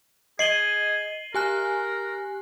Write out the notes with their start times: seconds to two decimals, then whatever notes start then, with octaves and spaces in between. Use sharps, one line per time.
0.39 G#4 D#5 C7 D#7 F#7 G7
1.35 G4 A#4 G#5 F#6